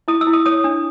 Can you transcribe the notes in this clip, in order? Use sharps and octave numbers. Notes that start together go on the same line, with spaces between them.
E4 D#6
E6
E4
D#6
C#5 D#6
D4